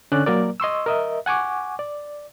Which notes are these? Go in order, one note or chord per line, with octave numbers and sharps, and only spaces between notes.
D3 C#4 D5 F#6
F#3 A#3 A#4 D5
D#5 C6 C#6 E6
A#4 D#5 E5
F#5 G#5 C#6 D6
D5